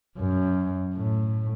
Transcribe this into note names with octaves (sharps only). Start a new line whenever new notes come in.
F#2
A2